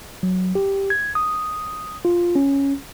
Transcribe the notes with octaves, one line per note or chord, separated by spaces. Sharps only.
F#3
G4
G#6
D#6
F4
C#4